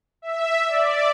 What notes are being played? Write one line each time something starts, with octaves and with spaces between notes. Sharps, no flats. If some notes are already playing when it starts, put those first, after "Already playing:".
E5
D5